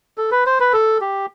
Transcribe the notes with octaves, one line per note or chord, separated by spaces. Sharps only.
A4
B4
C5
B4
A4
G4